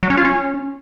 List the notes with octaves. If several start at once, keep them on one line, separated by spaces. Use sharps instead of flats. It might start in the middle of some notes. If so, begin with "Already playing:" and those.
F#3
C#4
F4
C#4